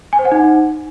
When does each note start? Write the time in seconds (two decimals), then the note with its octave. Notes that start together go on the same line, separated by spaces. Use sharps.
0.13 G#5
0.19 C5
0.25 F#5
0.32 D#4